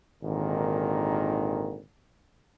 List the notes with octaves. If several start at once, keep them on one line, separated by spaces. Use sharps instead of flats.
G#1 A#2 D3 D#3